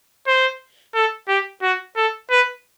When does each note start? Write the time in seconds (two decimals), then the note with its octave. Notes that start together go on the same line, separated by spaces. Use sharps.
0.27 C5
0.95 A4
1.28 G4
1.62 F#4
1.96 A4
2.31 B4